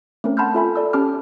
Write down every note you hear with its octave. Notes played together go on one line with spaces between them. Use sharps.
A3 C4 C#4 A#4
F#5 A5 B5 C6 F6 G6
F4 A4 E5 G#5 B5
A4 D5 E6
C#4 G4 A5 D6 F6